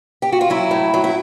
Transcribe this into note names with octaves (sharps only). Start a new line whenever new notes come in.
G4
F#4
F4
F#3 E4
A2
F#3
E4